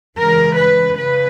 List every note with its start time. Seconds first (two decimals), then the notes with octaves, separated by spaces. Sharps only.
0.18 C#3 E3 G#3 A#4
0.57 B4
0.96 C#3 B4